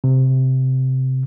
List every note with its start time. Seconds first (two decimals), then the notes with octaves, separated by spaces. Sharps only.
0.04 C3